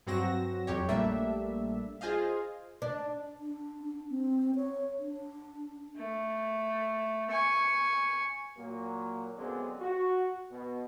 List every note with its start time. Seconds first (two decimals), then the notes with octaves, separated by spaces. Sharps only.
0.07 G2 F#3 C4 F#4 A#6 E7
0.67 F2 F#3 G4 C#5
0.88 A#1 G3 A3 A#3 D4 E5
2.01 F4 G#4 C5 D#5 F5
2.82 D4
3.40 D4
3.84 D4
4.10 C4
4.55 C#5
4.99 D4
5.97 A3
7.30 G#5 C#6
8.58 A#2 F#3 A#3
9.37 F#2 D3 G#3 B3 C4
9.80 F#4
10.51 B2